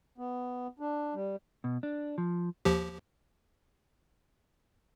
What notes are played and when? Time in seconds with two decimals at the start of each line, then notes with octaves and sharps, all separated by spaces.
0.18 B3
0.80 D4
1.14 G3
1.64 B2
1.83 D4
2.18 F3
2.65 D#2 F3 G4